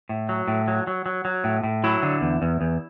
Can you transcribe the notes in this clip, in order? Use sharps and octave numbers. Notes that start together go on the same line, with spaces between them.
A2
F#3
A2
F#3
F#3
F#3
F#3
A2
A2
F#3 E4
D3
E2
E2
E2